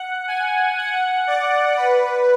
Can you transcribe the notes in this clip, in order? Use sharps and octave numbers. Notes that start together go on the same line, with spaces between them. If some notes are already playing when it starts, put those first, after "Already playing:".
Already playing: F#5
G#5
F#5
D5
B4